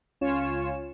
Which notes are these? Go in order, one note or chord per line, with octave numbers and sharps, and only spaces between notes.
C#2 C#4 F4 C#5 E7